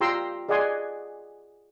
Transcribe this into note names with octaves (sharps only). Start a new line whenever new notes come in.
F4 G4 G5 A#5 C6 E6
G#4 D5 D#5 F#5 G#5 C6